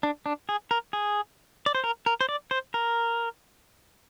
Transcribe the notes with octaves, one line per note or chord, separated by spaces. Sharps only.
D4
D4
G#4
A#4
G#4
D5
C5
A#4
A#4
C5
D5
C5
A#4